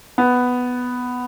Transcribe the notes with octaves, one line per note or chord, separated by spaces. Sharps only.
B3